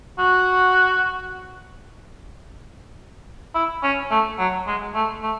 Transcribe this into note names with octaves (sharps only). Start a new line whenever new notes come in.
F#4
E4
C#4
A3
F#3
G#3
A3
A3